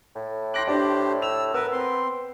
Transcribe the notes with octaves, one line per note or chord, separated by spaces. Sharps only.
A2
G5 C6 D6 F#6 A#6 F#7
D4 G4 C5
E6 F7
B3 A#4 B4 E6
C4 C6